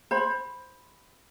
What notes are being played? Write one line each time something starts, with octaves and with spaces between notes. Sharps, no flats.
C5 B5